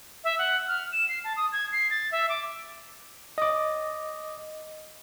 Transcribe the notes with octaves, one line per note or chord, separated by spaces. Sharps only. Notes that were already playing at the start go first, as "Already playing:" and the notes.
E5
F#5
F6
E7
C7
A5
D#6
G#6
C7
A6
E5
D6
D#5 D6